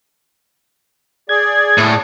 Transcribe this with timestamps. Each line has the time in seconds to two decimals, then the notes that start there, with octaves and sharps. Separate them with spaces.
1.29 G#4 D5 G#6
1.78 A2